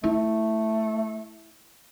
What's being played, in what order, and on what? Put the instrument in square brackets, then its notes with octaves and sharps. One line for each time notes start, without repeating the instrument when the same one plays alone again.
[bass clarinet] A3 [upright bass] E4